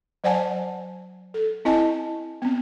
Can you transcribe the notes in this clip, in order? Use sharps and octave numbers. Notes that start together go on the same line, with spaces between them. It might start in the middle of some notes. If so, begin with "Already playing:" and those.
F#3 C5 D5 F#5 G#5 A5
A4
C4 E4 D#5 G#5 A5
B3 C4